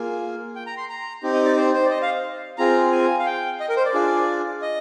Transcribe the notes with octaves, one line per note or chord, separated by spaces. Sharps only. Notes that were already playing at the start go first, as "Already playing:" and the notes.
Already playing: A#3 F4 G#4
G5
A#5
C6
A#5
C4 D#4 G4
D#5
D5
C5
C5
D5
D#5
F5
C4 F4 G#4 A#5
G#5
F5
G5
D#5
A#4
C5
D5
D4 F4 G#4
D#5